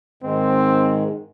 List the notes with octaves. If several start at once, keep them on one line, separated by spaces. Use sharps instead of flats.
G#2 D#3 G#3 C4